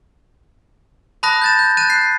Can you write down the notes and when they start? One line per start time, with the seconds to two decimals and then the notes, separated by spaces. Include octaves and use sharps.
1.23 A5 B5 D#6 F#6 A#6
1.42 G6 A6 E7
1.59 G6
1.77 F#6 G6 A6 D#7 E7
1.90 F#6 C7